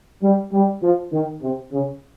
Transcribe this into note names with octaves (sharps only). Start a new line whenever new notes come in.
G3
G3
F3
D#3
C3
C#3